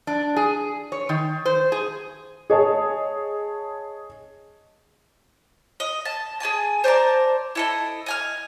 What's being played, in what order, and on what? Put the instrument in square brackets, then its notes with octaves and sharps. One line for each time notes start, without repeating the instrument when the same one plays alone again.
[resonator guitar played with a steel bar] D4
G#4
C#5
D#3
C5
G#4
[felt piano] G#4 C#5 D#5 A5
[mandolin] D#5
A5
G#4 D5 G#5 A5
C5 D5 A5 A#5
E4 A4 D#5
D#5 G#5 F6